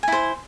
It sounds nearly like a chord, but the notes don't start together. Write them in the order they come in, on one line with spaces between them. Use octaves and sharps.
G#5 E4 C5